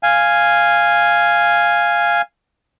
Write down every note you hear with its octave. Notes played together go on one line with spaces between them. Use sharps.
F5 G#5